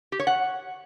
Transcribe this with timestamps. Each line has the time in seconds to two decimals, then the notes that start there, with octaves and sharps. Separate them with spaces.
0.12 G4
0.20 C#5
0.27 F#5